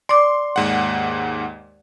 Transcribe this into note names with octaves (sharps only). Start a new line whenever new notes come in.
D5 C6 D6
D#2 G#2 F#5